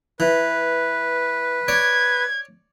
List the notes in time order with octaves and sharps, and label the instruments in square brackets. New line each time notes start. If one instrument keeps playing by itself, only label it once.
[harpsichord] E3 [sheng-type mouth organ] B4
[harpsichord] C#5 D5 [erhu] G#6